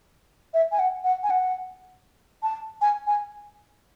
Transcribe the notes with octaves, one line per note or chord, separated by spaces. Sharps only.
E5
G#5
F#5
F#5
G#5
F#5
A5
G#5
G#5